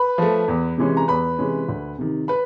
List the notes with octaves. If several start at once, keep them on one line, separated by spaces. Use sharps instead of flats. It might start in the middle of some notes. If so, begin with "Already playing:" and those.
Already playing: B4 B5
F3 A3
E2
C3 E3 G#3 C#4
A#5
E2 B4 B5
C3 E3 G#3 C#4
D2
C3 D#3
B4 B5